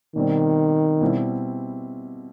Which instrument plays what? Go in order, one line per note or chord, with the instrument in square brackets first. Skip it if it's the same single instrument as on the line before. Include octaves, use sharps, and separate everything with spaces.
[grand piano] B2 G3 C4 [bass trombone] D#3
[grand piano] B2 G3 C4 E4